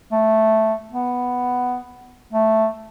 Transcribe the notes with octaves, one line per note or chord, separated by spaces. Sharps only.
A3
B3
A3